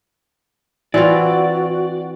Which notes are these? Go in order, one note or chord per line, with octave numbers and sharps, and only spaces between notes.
E3 C4 F4 F#4 D5